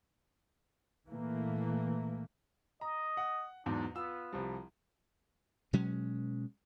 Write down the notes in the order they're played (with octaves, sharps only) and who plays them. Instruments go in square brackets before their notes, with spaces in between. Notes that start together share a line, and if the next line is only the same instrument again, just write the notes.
[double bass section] A#2 E3 A3 A#3
[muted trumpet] D#5 [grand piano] A#5
[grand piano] F#5
[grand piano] E2 G#2 F#3 [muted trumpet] D4
[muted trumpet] B3 [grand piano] F4 E6
[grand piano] C2 F3 G3
[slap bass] B2 F#3 G#3 C#4